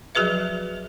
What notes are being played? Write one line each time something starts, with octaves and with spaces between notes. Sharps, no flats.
F3 F#3 F#4 G#4 B4 E5